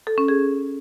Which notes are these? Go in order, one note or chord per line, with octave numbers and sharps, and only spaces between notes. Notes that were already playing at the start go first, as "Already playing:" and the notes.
A4
C#4
G#4